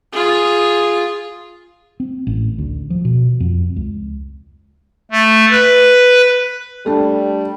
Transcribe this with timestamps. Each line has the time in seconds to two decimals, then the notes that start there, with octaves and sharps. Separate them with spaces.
0.12 F4 G#4
2.00 C4
2.27 A1
2.58 D2
2.90 F3
3.05 B2
3.40 F2
3.76 C#2
5.11 A3
5.51 B4
6.86 G3 A3 D4